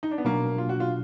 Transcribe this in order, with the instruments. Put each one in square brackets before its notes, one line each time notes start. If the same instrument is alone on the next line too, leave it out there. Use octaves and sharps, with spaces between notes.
[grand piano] D#4
D4
B3
[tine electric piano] B2 F#3 D4 [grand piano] A#3
[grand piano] F4
F#4
F4